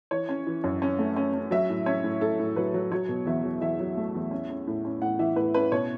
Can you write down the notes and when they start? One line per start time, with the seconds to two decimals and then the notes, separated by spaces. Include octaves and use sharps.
0.11 E3 C#5
0.29 C#4
0.47 E3
0.64 F#2
0.82 C#4
0.99 A3
1.16 C#4
1.34 C#4
1.51 F#3 E5
1.70 A2
1.86 C#4 C#5
2.04 A2
2.21 A2 A4
2.39 A2
2.56 F#3 B4
2.74 F#3
2.92 F#3 C#5
3.09 B2
3.26 E2 E5
3.44 F#3
3.61 E2 E5
3.79 F#3
3.97 A3
4.15 E2
4.31 C#4
4.50 C#4
4.67 A2
4.85 C#4
5.02 A2 F#5
5.19 E3 E5
5.36 A2 B4
5.54 C#4 B4
5.72 B2 C#5